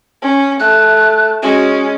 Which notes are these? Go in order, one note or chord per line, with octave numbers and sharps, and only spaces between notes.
C#4
A3 F#6
G#3 C#4 F#4